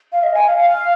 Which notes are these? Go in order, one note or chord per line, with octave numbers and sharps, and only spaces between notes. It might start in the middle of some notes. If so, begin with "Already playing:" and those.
F5
D#5
G#5
F5
F5